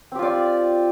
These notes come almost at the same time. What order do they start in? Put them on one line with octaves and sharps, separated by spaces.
C4 G4 F4 D5